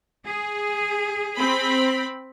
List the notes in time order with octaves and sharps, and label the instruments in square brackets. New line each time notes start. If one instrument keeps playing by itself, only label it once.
[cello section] G#4
[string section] C4 B5